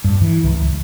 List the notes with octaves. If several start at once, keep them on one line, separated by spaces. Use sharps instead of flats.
G2
E3
C#2